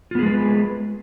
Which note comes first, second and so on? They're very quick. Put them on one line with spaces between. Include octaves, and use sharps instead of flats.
F4 B3 G#4 G#3 B4